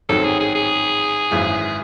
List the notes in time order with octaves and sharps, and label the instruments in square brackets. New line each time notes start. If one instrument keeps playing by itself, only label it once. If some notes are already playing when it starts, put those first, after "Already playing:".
[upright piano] A1 G#2 D#3 F#3 C4 [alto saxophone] A4
[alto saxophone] G#4
G#4
G#4
[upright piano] G#1 F#2 E3 G#3